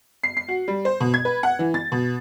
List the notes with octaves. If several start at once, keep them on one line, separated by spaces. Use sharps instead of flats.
C7
C7
F#4
G3
C5
B2
G#6
B4
F#5
E3
A6
B2